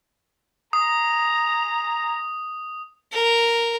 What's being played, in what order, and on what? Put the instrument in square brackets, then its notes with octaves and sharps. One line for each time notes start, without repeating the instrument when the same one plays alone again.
[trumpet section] G#4 A#5 [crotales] D#6
[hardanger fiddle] A#4